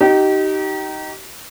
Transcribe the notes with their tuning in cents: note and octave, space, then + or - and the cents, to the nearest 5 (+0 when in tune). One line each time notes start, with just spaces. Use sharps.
D#4 +0 G4 -30